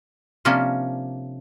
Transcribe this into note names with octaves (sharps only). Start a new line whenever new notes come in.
C3 F3 A#3 C#4 D4